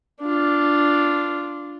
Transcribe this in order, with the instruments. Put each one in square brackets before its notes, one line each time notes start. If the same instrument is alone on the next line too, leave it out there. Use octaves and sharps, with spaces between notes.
[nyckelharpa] D4 F4